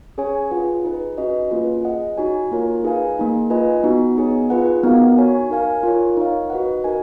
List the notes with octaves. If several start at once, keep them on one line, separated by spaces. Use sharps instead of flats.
C#4 G#4 C#5 G#5
F4 G#4 B4 F#5
D#4 G#4 B4
C#4 F#4 B4 D#5
A#3 C#4 F4 G#4 B4
G#4 D#5 F#5
D#4 F#4 C#5 G#5
A#3 F4 A#4 C#5
D#4 G#4 B4 F5 G#5
A#3 D#4 G#4
F4 B4 D#5 G#5
B3 D#4 F#4
B3 D#4 G#4 C#5 G#5
F4 G#4 B4 F#5
B3 D#4 F#4 A#4 F5
F#4 C#5 G#5
D#4 A#4 F5 G#5
F4 A#4 C#5
D#4 A#4 C#5 F5
F#4 B4 D#5 F#5
D#4 F#4 A#4 D#5 G#5